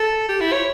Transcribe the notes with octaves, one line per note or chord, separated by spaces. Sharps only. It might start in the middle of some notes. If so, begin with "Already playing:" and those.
Already playing: A4
G4
E4
C#5